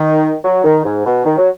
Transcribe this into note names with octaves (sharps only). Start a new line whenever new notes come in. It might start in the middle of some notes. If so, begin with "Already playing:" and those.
Already playing: D#3
F#3
D#3
G#2
B2
D#3
F#3